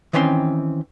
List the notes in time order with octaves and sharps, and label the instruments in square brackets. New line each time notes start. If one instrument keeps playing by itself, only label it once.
[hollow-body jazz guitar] D#3 E3 C4 C#4 C5 C6